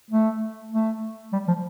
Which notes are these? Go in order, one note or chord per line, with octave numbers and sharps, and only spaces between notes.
A3
A3
G3
F3